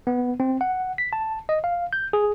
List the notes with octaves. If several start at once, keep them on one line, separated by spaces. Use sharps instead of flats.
B3
C4
F#5
B6
A5
D#5
F5
G6
G#4